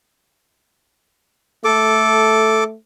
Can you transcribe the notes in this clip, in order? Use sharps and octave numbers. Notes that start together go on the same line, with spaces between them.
A3 A4 D6